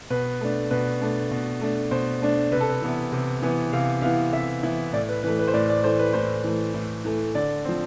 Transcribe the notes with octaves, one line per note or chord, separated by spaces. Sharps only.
B2 B4
A3 D4
B2 B4
A3 D4
B2
A3 D4
B2 C5
A3 D4
C3 B4
A4
B4
E3 B3 E4
C3
E3 B3 E4
C3 F5
E3 B3 E4 F5
C3 E5
E3 B3 E4
A2 D5
B4
E3 A3 B4
B4
C5
A2 D5
D5
E3 A3 C5
B4
A2 C5
E3 A3
A2
E3 A3
D3 D5
F3 C4